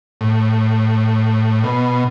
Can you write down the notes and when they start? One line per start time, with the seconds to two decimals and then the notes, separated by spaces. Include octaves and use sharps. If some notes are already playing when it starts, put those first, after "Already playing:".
0.21 A2
1.64 B2